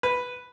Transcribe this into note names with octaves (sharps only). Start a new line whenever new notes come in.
B4